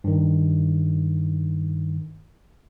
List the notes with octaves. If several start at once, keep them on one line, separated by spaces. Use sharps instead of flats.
G2 D#3